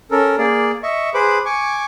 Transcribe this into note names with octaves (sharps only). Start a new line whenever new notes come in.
C#4 A4 A#4
A#3 G#4 D5
D#5 E5 C#6
G#4 B4 C5 B5 D6
G#5 C#6 D6